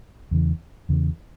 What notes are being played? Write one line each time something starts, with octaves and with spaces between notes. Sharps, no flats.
E2 C#3 E3
E2 C#3 E3